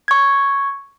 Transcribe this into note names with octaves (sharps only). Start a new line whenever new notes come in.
C#6 G#6